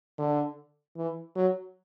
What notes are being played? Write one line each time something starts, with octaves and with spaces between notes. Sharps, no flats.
D3
E3
F#3